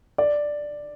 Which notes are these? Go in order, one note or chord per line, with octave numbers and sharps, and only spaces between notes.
D5